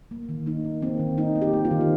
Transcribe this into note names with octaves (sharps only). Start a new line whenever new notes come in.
A#3
D#3
A#3 D#4
A#3
A#3 C4
D#3
A#3 D#4
A#3
G4
A#3
F4
D#3
C4